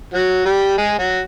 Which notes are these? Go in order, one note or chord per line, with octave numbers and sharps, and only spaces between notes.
F#3 F#4
G3 G4
G#3 G#4
F#3 F#4